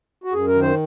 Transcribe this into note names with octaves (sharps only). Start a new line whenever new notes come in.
F#4
F#2 G#4
A#4
D#3
C5